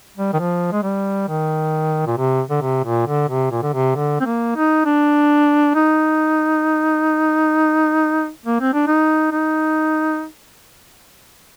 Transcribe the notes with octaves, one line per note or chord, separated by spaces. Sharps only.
G3
D#3
F3
G#3
G3
D#3
A#2
C3
D3
C3
A#2
D3
C3
A#2
D3
C3
D3
C4
A#3
D#4
D4
D#4
A#3
C4
D4
D#4
D#4